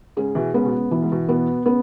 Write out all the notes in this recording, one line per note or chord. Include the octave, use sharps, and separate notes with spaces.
G#2 C#3 G#4
B2 E3
G#2 C#3 B3
B2
G#2 C#3
B2 E3
G#2
B2
B2 B3
C#3 B3